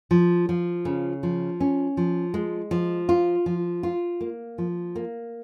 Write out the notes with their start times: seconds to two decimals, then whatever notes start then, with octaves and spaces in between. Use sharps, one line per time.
0.11 F3
0.49 F3
0.85 C#3
1.23 F3
1.60 C#4
1.97 F3
2.34 G#3
2.71 F3
3.09 F4
3.46 F3
3.83 F4
4.21 A#3
4.58 F3
4.96 A#3